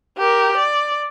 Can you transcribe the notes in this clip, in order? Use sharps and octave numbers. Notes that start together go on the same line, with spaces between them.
G4 A#4
D5